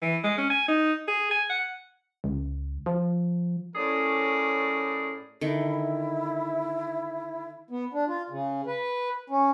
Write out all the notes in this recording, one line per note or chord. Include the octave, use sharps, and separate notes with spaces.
E3
G#3
C#4
G#5
D#4
G#4
G#5
F#5
C#2
F3
A2 C#4 G#4 A#4 D5
D3 D#3 E4
B3
D4
F4
C#3
B4
C#4